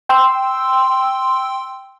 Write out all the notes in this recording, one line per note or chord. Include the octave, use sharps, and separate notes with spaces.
G5 C6 E6